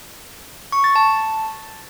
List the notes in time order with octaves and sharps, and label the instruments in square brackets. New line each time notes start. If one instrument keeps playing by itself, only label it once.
[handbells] C#6
A6
A5